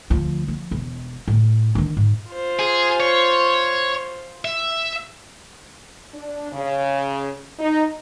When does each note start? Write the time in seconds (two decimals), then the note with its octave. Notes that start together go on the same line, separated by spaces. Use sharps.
0.10 D2 F3
0.48 F3
0.71 E1
1.28 A2
1.75 D#3 D4
1.97 G#2
2.29 F4 C5
2.59 G#4
3.00 C#5
4.45 E5
6.14 D4
6.52 C#3
7.58 D#4